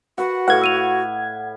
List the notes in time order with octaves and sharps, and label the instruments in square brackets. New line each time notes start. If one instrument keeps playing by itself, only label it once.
[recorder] F#4 [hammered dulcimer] B4 F#5
[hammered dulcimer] A2 F5 [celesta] A4 B4 [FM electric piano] F#5 G#6
[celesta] E6 D#7 F7